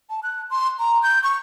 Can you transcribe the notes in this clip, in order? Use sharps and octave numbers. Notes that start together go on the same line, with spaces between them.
A5
F#6
C6
A#5
G6
C#6